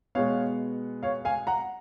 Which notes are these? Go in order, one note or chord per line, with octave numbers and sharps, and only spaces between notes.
B2 G#3 B3 C#5 F5
C#5 F5
F5 G#5
F#5 A#5